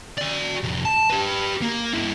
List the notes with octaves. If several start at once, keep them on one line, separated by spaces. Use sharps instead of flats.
F#4 D5
C2 F2
A5
G4 B4
A#3
G2 E4